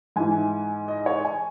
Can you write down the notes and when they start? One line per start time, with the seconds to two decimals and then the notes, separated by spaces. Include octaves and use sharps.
0.16 G#2 E3 G#5
0.88 D#5
1.06 C#5
1.25 G#5